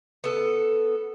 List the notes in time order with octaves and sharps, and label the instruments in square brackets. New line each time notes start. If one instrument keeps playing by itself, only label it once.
[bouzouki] B3 A4